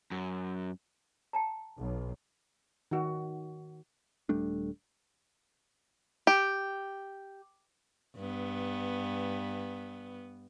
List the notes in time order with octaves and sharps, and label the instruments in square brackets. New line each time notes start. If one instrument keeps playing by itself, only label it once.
[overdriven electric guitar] F#2
[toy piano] G5 A5 A#5
[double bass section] B1
[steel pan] D#3 F#4
[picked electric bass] D#1 G3 A3 D4
[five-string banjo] G4
[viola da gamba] G2 B3